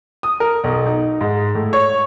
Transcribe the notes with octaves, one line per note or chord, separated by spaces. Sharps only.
D#6
A#4
B1
D#4
G#2
A2
C#5